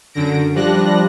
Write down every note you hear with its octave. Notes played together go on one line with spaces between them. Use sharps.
F#2 D3 A#6 D7
F3 G3 D4 F#6 A#6